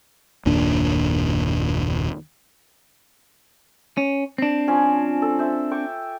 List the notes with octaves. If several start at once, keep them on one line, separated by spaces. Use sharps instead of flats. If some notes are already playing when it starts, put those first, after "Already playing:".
F#1 D#2 A#2 D4
C#4
C4 D4
F3 C#4 G#5
A4
C5 E5
G5 C#6 D6